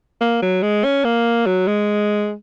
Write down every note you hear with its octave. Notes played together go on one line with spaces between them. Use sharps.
A#3
F#3
G#3
C#4
A#3
F#3
G#3